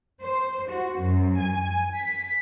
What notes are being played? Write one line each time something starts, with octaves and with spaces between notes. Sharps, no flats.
C5
F#4
F#2
G#5
B6